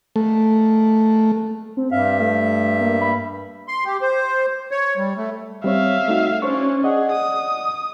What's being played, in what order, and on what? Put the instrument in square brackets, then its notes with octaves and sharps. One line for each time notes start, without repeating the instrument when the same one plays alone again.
[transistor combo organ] A3
[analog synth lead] C4
[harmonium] G2 E5 [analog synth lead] F5
[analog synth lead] A3
A#3
B5
[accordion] C6
G4
C5
C#5
G3
A3
[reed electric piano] G3 C4 C#5 [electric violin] E5 F5
[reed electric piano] A3 D#4 F#4
[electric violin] C#4 D4 [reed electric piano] C5 C#5 C#6
[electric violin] G#4 [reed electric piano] D5 D#5 F#5
[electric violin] D#6